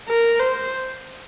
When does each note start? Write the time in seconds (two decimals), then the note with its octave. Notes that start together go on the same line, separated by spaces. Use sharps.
0.08 A#4
0.39 C5